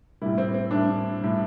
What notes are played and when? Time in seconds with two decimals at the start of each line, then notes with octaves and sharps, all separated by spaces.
0.22 A2 G3 E4
0.38 C4
0.54 C4
0.71 A2 G3 D4
1.20 A2 G3